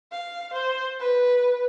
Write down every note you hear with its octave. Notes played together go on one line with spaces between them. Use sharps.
F5
C5
B4